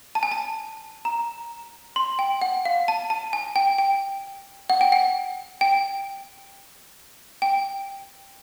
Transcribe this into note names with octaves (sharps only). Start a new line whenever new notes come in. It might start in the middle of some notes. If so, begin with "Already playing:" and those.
A5
G#5
A5
A#5
C6
G5
F#5
F5
A5
A5
G#5
G5
G5
F#5
G5
F#5
G5
G5